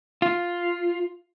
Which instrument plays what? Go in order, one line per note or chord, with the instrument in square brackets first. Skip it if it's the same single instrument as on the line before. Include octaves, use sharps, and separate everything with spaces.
[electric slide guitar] F4